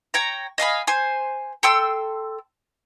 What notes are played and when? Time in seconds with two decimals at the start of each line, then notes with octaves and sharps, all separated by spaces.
0.14 C#5 G5 A#5
0.58 D#5 F5 G#5 B5
0.87 C5 G#5
1.63 A4 G5 C6 E6